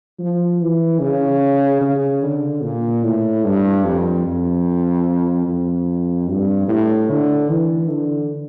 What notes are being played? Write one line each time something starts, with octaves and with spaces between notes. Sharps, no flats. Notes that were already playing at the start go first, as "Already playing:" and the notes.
F3
E3
C#3
C#3
D3
A#2
A2
G2
F2
F2
F2
G2
A2
D3
E3
D3